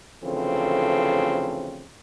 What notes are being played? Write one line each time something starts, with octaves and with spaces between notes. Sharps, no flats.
D2 C#3 E3 F3 C4 A4